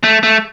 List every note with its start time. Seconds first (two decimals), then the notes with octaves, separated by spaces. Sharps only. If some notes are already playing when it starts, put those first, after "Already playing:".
0.04 A3
0.23 A3